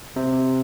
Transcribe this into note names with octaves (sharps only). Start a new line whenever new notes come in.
C3